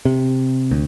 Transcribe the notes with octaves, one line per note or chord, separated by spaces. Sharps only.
C3
D2